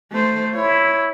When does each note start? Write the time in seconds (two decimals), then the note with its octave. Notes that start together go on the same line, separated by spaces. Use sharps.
0.12 A3 C5
0.54 E4 C#5